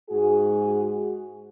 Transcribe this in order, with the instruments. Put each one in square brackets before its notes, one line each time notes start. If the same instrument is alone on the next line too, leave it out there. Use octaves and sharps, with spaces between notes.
[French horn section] G#2 F#4 G#4